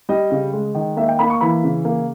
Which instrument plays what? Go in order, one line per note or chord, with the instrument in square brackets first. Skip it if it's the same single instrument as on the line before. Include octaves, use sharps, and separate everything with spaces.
[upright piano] G3 D#5
C#3
G#3
D#3
A#3 E5
G5
A#3 B5
C#6
E3 B5
C#3
A#3